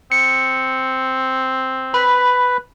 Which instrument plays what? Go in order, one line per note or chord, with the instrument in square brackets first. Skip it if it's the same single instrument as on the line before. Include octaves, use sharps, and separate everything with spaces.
[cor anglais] C4 [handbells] C#7
[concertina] B4 [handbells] B5